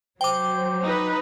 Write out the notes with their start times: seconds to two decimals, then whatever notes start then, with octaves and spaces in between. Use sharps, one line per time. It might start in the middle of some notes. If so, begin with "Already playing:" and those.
0.21 F#3 C5 G5 D6
0.85 D#4 B4